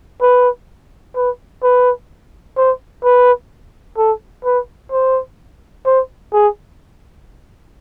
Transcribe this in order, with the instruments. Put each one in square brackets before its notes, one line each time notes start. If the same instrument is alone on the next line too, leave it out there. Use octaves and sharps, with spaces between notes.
[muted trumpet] B4
B4
B4
C5
B4
A4
B4
C5
C5
G#4